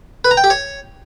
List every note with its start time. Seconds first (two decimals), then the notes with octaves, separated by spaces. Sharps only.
0.25 B4
0.31 A#5
0.37 G5
0.44 G4
0.50 C#5